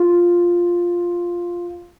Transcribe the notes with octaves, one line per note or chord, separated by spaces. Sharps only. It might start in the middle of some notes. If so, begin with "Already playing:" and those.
Already playing: F4